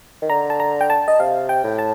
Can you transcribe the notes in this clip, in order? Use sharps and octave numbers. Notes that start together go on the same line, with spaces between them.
D#3
D3 A#5
A5
A#5
G5
A5
D#5
C3 F5
G5
A2
A5